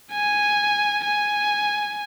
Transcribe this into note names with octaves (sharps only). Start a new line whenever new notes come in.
G#5
G#5